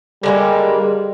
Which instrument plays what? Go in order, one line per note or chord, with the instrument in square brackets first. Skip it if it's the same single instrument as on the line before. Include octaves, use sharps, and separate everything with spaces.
[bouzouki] D3 G#3 A#3 [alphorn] G3